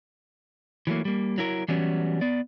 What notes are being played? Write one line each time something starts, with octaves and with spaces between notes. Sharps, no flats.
E3 F#3 A3 A#3
G3 A#3
F#3 E4 A#4
E3 F#3 G3 B3 C#4
B3 D5